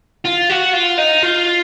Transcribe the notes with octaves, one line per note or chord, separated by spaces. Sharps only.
F4
F#4
F4
D#4
F4